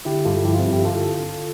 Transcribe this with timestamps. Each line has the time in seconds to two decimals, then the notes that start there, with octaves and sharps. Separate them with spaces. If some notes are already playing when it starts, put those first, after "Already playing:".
0.05 D3 E4 G4
0.25 G2 F4 A4
0.45 F3 E4 G4
0.54 F4
0.59 C4 E4
0.65 G2
0.72 E4 G4
0.85 D3 F4 A4